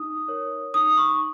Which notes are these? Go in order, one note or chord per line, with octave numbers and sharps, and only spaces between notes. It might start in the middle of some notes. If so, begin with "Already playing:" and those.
Already playing: D#4 D#6
A#4 C#5
D#4 D#6
C#6